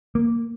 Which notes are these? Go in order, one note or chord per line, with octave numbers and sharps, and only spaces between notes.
A#3